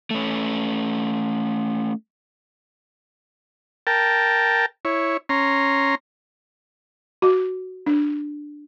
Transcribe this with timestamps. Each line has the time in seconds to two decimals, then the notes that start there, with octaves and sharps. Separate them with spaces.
0.11 A3 C#4
3.87 A#4 G5 A5
4.85 E4 C#5
5.29 C#4 A#5 C6
7.22 F#4
7.86 D4